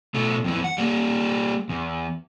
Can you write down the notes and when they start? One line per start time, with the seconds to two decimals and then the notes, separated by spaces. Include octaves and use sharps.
0.14 B2 A3
0.44 F2 E3
0.64 F#5
0.78 G3 A#3
1.69 E2